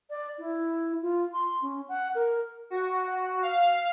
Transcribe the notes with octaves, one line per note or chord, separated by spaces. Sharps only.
D5
E4
F4
C6
C#4
F#5
A#4
F#4
F5